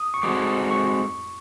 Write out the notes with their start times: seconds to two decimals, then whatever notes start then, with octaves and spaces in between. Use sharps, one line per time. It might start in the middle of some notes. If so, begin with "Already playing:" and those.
Already playing: D#6
0.14 C#6
0.23 G#3 C4 D#4 F#4 A4 D6
0.71 C#6